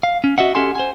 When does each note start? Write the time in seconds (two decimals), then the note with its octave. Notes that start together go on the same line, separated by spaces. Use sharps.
0.03 F5
0.24 C#4
0.38 F#4 D#5 E5 F#5
0.55 C#4 G4 A4 F#5 G#5 C6
0.75 C5 G#5